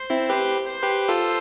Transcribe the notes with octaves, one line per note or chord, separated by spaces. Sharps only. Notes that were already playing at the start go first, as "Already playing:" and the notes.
Already playing: C5
C4 E4
G4 B4 C5
C5
G4 B4
F4 A4